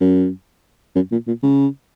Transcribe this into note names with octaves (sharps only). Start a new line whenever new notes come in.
F#2
F#2
A#2
A#2
C#3